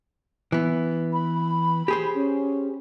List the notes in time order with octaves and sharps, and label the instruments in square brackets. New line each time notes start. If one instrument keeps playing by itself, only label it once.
[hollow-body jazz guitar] E3 B3
[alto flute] B5
[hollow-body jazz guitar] G4 G#4 C5
[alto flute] C#4